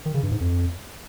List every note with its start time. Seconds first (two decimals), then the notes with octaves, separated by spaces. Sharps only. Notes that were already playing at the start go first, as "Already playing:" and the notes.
0.06 D#3
0.14 C#3
0.23 G2
0.32 G#2
0.40 F2